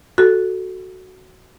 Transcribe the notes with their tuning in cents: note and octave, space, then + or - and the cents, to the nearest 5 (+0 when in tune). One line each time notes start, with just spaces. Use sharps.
F#4 +5 A4 +0